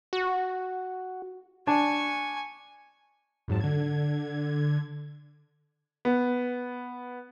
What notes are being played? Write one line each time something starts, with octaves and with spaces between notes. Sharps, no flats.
F#4
D4 G#5 C#6
F2 G#2 F#3 A5
D3 G#6
B3